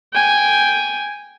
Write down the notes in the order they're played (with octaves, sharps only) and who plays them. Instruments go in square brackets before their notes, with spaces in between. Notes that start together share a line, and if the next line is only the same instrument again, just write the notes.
[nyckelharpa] G5 G#5